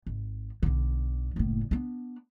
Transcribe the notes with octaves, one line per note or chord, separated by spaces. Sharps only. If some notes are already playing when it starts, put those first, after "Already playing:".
G#1
B1 D3
F#1 A2
B3 D4